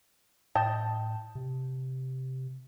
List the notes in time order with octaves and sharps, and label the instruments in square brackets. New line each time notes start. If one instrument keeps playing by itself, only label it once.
[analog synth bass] A2 [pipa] D#5 G5 A5
[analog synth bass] C3